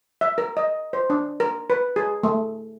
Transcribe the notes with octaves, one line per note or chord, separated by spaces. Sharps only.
E5
A#4
D#5
C5
D4
A#4
B4
G#4
A3